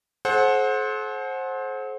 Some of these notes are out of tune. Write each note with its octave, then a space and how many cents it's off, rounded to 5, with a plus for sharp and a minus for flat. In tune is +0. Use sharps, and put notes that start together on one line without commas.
A4 -45 C5 +20 F#5 -10